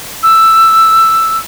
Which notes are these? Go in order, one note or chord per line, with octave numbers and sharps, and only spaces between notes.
E6